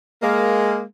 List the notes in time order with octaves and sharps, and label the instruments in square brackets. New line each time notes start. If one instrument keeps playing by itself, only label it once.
[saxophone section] G#3 A#3